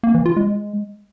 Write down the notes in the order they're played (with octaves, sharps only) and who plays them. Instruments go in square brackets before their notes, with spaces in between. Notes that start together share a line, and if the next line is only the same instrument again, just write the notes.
[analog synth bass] A#3
E3
F4
G#3